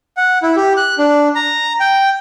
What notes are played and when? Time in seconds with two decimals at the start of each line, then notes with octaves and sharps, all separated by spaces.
0.17 F#5
0.43 E4
0.56 G4
0.77 F#6
0.98 D4
1.35 A#5
1.80 G5